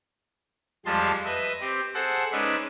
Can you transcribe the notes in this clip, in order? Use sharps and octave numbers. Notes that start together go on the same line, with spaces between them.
F2 F3 G3 G#3 A5 C6
B4 D#5 E5
C4 G4
G#4 A4 C5 F#5
G#3 C#4 D#4 B4 D5 E5